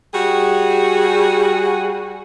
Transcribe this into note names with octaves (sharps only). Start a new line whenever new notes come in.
G3 F#4 G#4